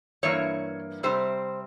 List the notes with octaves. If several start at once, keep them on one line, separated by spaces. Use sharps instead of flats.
G2 E3 A#3 C#5
C3 G3 C4 C5